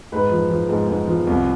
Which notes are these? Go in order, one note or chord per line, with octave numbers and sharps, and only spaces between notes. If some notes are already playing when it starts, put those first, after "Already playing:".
G#2 B4
F3
F3
G#2
G#2
F3
C2